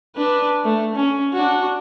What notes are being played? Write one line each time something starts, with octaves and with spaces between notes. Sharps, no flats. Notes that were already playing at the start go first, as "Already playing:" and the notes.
D4 B4
A3
C#4
D4 F#4